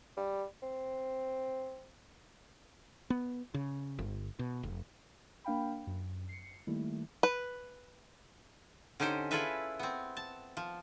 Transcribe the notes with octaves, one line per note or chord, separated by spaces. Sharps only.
G3
C4
B3
C#3
G1
B2
F1
A#3 D4 F5 G5 B5
F#2
C7 C#7
D#3 G3 A3 A#3 E4
B4
D3 C#4 D#4 G4 C5
E4 F4 G#4 A4 B4 E5
B3 C4
A5
F3